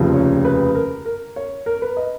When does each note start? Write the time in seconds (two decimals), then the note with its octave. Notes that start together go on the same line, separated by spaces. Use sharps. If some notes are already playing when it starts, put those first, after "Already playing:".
Already playing: F1 D#2 C#3 F3
0.14 C#5
0.45 B4
0.75 A#4
1.06 A#4
1.36 C#5
1.66 A#4
1.82 B4
1.97 D#5